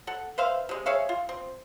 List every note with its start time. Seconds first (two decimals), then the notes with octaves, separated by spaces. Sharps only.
0.07 A4 F#5
0.38 B4 C5 E5 F5
0.69 C3 G#3
0.86 G#4 C#5 E5 F5
1.09 F4
1.29 C4